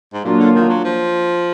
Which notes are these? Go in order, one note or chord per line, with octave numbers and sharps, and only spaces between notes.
G#2
A#2 F#3 A#3 D4 F4
D3
D#3
F#3
F3